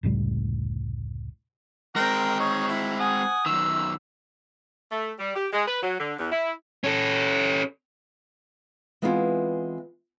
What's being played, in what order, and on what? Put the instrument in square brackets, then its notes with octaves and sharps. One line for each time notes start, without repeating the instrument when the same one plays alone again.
[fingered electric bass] F1 C#2 A2 G3
[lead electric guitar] G#3 C4 [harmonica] A#4 G5 A#5
[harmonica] D#4 C#5
E4
F#5 G#5 D#6
[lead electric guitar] F#2 D#3 [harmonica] E6
[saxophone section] A3
G3
G4
G#3
B4
F#3
D3
E2
E4
[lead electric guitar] C#4 A4
[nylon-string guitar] E3 G#3 B3 C4 E4 F4